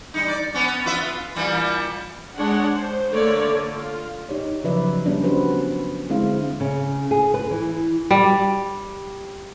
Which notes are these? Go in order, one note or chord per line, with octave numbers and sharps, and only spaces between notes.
G3 D#4
D5
B3 C#4
F4 B4 E5
A#2 E3 G3
G#3 D4 C#5 F#5
C5
D3 A3 A#3 C#5 D5
D3
F4
D#4 G4 C#5 D5
C#3 F3 F#3 B4 D5 E5
G3 A#3 B3 C#4 D4
B3 C#4 F#4 G4 B4 C5
D3 G#3 C4 E4 C5 F5
C#3
G#4
B4
E3
G3